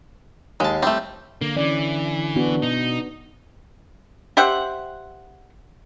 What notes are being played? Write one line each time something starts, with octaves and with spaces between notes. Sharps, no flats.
D#2 G#3 A5
G3 A3 C4
D3 A#3
E3 C#4 D5
B3 D4 F#4
B2 D#4
G4 C5 E5 F#5